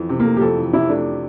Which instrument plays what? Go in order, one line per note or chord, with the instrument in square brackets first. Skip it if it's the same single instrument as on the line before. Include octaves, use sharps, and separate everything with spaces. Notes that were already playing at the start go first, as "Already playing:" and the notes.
Already playing: [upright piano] F2 E3
C3
[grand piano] A#3
[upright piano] A3
[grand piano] G4
[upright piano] F2 [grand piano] A4
[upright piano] E3
[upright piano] C3 [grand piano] E4
[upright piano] A3 [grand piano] D4